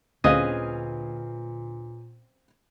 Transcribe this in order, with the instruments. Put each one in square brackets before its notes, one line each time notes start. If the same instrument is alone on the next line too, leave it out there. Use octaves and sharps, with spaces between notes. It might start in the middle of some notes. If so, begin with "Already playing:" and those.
[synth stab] D2 [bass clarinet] A#2 [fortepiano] C4 C#4 F5 [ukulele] G#4 B4 D#5